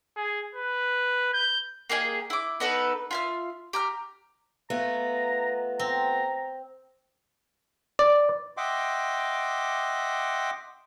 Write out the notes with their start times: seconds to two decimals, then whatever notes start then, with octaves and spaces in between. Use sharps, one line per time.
0.16 G#4
0.55 B4
1.34 G6
1.89 A#3 G4 G#4 D#5
2.30 E4 D6
2.60 B3 D#4 A4 B4
3.11 F4 E5 F6
3.73 G4 A#5 F6
4.70 A3 B3 F4 A#5
5.79 C4 A#5
7.99 D5
8.57 D#5 E5 F#5 G5 C6 D6